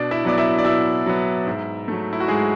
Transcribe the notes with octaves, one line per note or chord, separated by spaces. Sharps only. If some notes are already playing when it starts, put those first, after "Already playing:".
Already playing: B2 D4 D5
E4 E5
F#3 B3 D5
E4 E5
D5
B2 E4 E5
F#3 B3
G#2
F#3 A3
E4
F#4
G#2 G#3 G#4